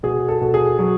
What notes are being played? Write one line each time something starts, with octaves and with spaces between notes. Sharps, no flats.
B2 G#4
A4
B2
G#4
F#3